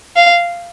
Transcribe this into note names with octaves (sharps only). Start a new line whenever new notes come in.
F5